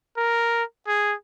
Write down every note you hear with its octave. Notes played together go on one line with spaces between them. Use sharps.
A#4
G#4